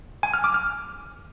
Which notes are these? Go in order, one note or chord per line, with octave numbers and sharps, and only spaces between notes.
G#5
F6
D6
F6